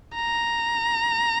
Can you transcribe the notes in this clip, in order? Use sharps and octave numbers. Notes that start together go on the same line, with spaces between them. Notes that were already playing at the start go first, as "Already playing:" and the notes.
A#5